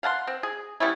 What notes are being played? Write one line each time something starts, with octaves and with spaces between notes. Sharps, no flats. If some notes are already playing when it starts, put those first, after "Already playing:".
F5 F#5 A5 C6
C4
G#4
G3 B3 C#4 E4